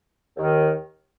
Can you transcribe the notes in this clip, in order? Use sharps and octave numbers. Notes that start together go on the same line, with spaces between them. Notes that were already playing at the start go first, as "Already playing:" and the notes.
D#2 D#3